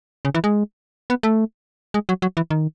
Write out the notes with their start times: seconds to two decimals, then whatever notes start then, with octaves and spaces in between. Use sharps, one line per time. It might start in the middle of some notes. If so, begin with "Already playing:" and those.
0.25 C#3
0.34 E3
0.44 G#3
1.10 B3
1.23 A3
1.94 G#3
2.09 F#3
2.22 F#3
2.37 E3
2.50 D#3